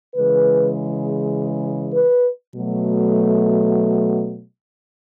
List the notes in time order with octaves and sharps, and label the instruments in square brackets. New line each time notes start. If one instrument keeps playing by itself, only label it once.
[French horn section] C#3 E3 G#3 B4
B4
B2 F#3 A3